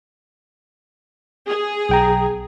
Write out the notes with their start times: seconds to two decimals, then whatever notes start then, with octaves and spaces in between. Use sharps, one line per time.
1.48 G#4
1.89 B1 G5 A#5